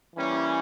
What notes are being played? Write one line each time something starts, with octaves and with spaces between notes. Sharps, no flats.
E3 G3 A#3 C#4